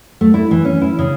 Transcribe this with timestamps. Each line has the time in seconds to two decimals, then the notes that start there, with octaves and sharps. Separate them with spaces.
0.21 A3
0.34 E4
0.51 E3
0.65 C#4
0.82 E4
0.99 C#3